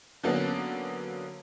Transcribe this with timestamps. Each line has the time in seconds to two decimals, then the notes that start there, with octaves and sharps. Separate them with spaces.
0.23 D3 F#3 A#3 B3 C#4 D4